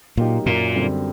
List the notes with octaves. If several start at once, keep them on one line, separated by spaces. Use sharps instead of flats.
A#2 F#3 A#3 D#4 G4
F#2 A#2
D3 G3 C4